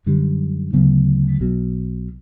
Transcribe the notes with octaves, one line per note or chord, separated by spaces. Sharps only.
F#2 D3 G3
D2 C#3 F#3 B3
B1 B2 F#3